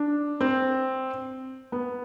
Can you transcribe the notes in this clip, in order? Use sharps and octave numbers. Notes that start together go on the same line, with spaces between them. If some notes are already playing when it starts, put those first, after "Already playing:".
Already playing: D4
C4
B3